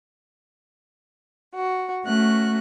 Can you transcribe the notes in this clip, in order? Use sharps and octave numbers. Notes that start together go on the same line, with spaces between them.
F#4
A3 C#4 F#4 F#6